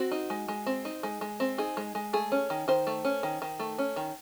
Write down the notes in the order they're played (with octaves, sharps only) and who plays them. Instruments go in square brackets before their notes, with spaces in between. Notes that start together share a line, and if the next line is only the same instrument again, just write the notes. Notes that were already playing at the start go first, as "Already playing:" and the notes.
Already playing: [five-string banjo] C4 F#4
D#4
G#3
G#3
C4
D#4
G#3
G#3
C4
D#4 G#4
G#3
G#3
A3 G#4
C#4
D#3
D#3 C5
A3
C#4
D#3
D#3
A3
C#4
D#3